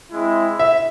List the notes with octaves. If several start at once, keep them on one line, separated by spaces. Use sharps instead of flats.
G#3 C4 E4
E5